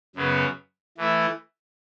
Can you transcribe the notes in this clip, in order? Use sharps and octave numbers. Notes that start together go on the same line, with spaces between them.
F#2 C#3 F#3 B3
E3 A3 E4